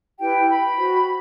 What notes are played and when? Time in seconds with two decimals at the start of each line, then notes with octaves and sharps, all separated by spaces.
0.20 E4 G4 B4 G5
0.49 B5
0.77 F#4 C5